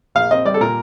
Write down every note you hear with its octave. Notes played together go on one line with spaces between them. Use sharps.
A#1 F5
C4 D#5
G3 D5
A4
A#2 A#4